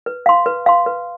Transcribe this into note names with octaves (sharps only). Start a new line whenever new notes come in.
B4
F5 C6
B4
F5 C6
B4